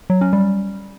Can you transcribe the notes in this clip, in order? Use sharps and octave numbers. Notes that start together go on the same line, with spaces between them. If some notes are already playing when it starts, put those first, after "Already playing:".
F#3
C#4
G3